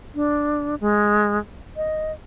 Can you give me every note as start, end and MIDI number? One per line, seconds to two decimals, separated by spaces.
0.15 0.75 62
0.81 1.38 56
1.77 2.12 75